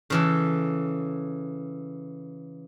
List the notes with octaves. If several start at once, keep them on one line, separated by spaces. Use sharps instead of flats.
C#3 E3 A4